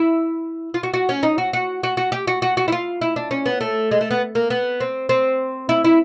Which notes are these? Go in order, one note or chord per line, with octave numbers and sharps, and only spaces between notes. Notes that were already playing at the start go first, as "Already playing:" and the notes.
Already playing: E4
F4
F#4
F#4
C#4
D#4
F#4
F#4
F#4
F#4
G4
F#4
F#4
F#4
E4
F4
E4
D4
C#4
B3
A3
G#3
A3
B3
A#3
B3
C4
C4
E4
E4